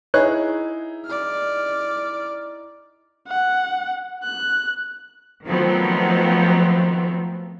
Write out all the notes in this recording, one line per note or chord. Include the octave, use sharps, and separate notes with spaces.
D#4 E4 G#4 B4 C#5 F#6
D5 F6
F#5
F#6
D#3 F3 F#3 A3 B3 C4